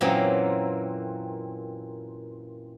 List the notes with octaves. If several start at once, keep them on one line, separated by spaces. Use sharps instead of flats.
F#2 A#2 E3 F#3 A#3 C4